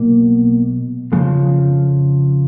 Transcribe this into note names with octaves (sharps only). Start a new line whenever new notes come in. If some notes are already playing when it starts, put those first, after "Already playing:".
Already playing: B1 B2 A#3
F2 C#3 F3 G#3